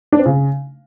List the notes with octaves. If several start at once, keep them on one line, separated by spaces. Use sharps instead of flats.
D4
C4
C#3